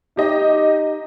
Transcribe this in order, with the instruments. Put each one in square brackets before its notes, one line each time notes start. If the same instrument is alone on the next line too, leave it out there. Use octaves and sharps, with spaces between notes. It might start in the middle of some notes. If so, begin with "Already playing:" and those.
[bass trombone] D#4 [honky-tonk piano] G4 D#5